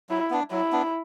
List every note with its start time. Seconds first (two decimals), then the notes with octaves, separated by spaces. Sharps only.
0.09 F#3 E4
0.30 B3 D4
0.51 F#3 E4
0.72 B3 D4